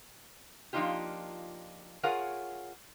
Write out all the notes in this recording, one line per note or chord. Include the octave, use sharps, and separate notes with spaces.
F3 A#3 D4 D#4 F4 G4
F4 G#4 A#4 C#5 F5 F#5